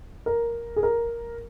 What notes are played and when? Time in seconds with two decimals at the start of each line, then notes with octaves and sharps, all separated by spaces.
0.26 A#4
0.76 G#4
0.83 A#4